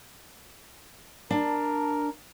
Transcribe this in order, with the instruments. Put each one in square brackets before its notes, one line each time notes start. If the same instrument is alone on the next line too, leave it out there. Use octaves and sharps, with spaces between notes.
[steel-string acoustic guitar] D4 A5 [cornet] A#4